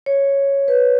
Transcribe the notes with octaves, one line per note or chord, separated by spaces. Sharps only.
C#5
B4